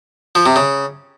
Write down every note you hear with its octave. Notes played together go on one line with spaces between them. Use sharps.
F3
C3
C#3